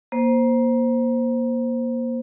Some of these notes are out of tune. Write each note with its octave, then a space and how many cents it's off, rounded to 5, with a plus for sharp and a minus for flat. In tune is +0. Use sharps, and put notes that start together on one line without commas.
A#3 +25 C5 +0